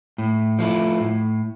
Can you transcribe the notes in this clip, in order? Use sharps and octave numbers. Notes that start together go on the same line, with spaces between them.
A2
F3 A3 E4
A2